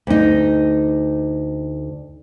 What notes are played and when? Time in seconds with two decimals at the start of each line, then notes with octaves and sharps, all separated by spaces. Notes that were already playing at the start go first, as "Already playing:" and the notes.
0.07 D2 D#4